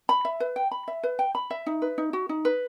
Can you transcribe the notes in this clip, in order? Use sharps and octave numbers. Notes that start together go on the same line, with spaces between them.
B5
E5
B4
G5
B5
E5
B4
G5
B5
E5
D#4
B4
D#4
F#4
D#4
B4